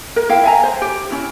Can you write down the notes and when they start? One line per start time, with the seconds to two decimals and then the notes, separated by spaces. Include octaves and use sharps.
0.16 A#4
0.29 E4 F5 G5
0.44 E5 G#5 A#5
0.63 C5
0.82 G4
1.11 C#4 E4